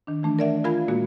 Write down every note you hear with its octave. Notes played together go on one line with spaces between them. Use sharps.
D#3 D4
E3 A3 D4
A#4 D5 E5 F#5
F4 A#4 F5 G#5 B5 G#6
A#2 G#3 A#3 F#4